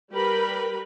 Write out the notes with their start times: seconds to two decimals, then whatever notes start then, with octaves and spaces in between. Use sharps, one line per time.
0.13 G3 G4 A#4 B4 B5